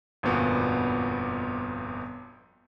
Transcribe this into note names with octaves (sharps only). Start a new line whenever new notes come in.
G1 F2 A#2 F3 B3 F#4